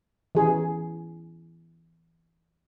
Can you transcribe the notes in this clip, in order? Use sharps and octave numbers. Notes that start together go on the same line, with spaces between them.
E3 G#4